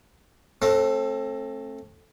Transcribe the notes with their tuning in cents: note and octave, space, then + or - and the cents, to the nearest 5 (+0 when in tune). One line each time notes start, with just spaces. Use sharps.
A3 +0 C4 +35